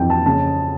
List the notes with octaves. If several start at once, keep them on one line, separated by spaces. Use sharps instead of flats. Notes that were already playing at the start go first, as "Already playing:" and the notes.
Already playing: F2 E3 G5
A5
C#3 A5